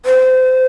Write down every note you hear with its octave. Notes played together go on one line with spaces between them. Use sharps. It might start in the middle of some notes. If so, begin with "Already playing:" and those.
C5